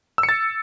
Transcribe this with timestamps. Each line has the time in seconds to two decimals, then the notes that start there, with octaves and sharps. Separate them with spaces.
0.18 E6
0.23 C#7
0.29 A6